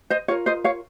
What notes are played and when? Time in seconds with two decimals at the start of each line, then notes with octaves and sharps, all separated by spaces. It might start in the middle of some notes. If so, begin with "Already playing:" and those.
0.10 C5 D#5
0.28 F4 A#4 C#5
0.46 C5 D#5
0.64 C#5 F5